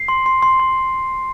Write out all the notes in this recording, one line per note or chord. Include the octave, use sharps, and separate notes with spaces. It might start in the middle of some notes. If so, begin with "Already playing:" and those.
Already playing: C7
C6
C6
C6
C6